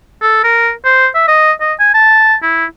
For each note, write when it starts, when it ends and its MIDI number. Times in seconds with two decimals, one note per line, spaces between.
0.21 0.41 69
0.44 0.71 70
0.85 1.07 72
1.15 1.28 76
1.28 1.52 75
1.61 1.73 75
1.80 1.89 80
1.94 2.35 81
2.42 2.65 64